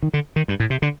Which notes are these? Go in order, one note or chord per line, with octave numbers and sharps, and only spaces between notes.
D#3
D3
D#3
G2
A2
C3
D3